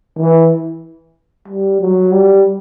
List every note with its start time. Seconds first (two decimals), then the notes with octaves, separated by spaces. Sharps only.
0.18 E3
1.48 G3
1.81 F#3
2.13 G3